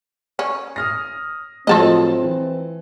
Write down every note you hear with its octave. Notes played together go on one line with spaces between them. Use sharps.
C#4
D#6 F6 A#6
A2 F3 F#3 C4 F4 A4 D#5
E3